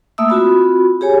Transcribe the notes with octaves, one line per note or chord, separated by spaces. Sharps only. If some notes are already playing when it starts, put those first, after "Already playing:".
A3 A#3 E5 D#6 E6
C4 F4 F#4 B5
G4 G#4 C#5 G#5